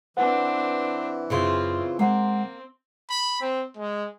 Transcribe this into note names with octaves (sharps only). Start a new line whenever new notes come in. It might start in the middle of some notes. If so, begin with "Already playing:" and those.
E3 C4 D4 B4 F#5
F#2 C#3 C4 E4 F4
G#3 A#3 C4 F#5 C6
B5
C4
G#3